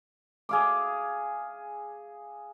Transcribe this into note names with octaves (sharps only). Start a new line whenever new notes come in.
G#4 F5 D6